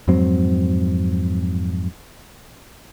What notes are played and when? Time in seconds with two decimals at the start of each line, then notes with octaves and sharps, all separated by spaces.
0.08 F2 G#2 F#3 C4